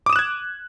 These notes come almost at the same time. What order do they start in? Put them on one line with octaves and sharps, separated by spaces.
D6 D#6 E7 F#6 G#6